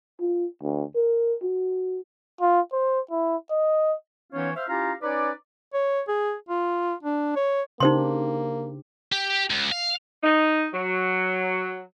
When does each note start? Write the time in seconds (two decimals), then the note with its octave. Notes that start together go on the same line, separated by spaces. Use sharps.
0.20 F4
0.63 D2
0.96 A#4
1.43 F#4
2.41 F4
2.73 C5
3.11 E4
3.51 D#5
4.33 E3 B3 C#4 D#4 F4 C#5
4.56 C5 E5 F5 F6
4.68 C#4 E4 F4 G4 F5 A#5
5.02 C#4 D#4 B4 C#5 D5
5.74 C#5
6.08 G#4
6.49 F4
7.03 D4
7.36 C#5
7.80 C#3 A#3 D4 D#4 G4 C5 C6
9.12 G4
9.50 C#2
9.72 F5
10.23 D#4
10.74 F#3